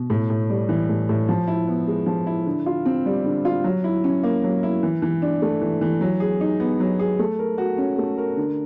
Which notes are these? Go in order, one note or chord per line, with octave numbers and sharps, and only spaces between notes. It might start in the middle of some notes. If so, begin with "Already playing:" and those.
Already playing: B2
A2
A2
G3
E3
A2
A2
F3
E4
B3
G#3
F3
E4
D3
F4
C4
G3
D3
F4
F#3
E4
C#4
A#3
F#3
E4
E3
E3
D4
A3
E3
E3
F#3
G#4
D#4
B3
F#3
G#4
A3
A#4
F#4
C#4
A3
A#4
D3